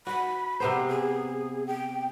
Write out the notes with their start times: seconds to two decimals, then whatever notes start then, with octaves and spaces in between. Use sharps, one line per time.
0.07 F#4 B5
0.60 C3 B3 C5 A#5
0.89 G#4
1.67 G5